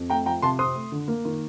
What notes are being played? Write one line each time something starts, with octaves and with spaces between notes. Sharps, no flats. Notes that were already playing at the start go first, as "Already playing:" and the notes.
Already playing: F2
A3 G5 A#5
F3 G5 A#5
C3 A5 C6
C4 C6 D#6
A3
D3
A#3
D#3